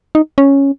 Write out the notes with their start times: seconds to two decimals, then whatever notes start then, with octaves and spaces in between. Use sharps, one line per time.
0.15 D#4
0.38 C#4